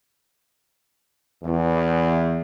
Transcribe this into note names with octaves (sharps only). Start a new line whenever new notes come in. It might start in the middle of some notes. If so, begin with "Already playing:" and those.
E2